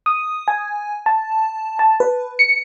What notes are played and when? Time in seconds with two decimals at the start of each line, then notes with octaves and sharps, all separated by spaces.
0.06 D#6
0.48 G#5
1.06 A5
1.79 A5
2.00 B4
2.39 C#7